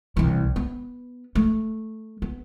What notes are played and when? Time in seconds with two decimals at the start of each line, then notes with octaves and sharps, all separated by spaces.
0.17 C2 E3
0.56 B3
1.35 A3
2.22 B3